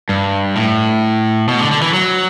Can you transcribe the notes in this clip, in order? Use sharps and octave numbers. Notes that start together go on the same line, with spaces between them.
G2
A2
B2
D3
D3
E3
F#3